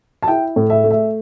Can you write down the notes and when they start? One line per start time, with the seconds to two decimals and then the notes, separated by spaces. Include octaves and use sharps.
0.23 A5
0.28 E4 G5
0.56 A2
0.70 E5
0.84 A3
0.91 E5